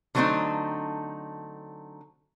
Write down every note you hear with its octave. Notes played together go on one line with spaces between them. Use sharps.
D3 F#3 A3 B3 C4 D#4